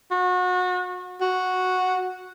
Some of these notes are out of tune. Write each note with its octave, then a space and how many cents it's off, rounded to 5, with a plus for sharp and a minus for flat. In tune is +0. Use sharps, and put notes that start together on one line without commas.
F#4 -30
F#4 -5